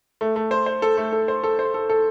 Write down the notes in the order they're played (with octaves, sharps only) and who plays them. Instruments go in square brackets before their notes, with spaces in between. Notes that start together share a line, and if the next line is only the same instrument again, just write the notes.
[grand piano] A3
A3
C5
C5
A4
A3
A4
C5
A4
C5
A4
A4